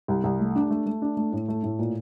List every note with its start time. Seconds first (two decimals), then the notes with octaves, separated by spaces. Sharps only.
0.08 C2
0.24 C2
0.39 A3
0.56 D4
0.70 A3
0.86 A3
1.02 D4
1.17 A3
1.32 A2
1.48 A3
1.63 A2
1.79 A#2